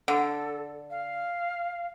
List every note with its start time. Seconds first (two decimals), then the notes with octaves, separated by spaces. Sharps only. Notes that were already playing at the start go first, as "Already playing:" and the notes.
0.08 D3 A4
0.90 F5